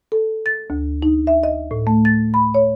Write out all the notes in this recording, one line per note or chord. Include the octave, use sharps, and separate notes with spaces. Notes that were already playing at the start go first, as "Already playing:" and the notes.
A4
A6
D2
D#4
E5
D#5
A2
A3
A6
B5
C#5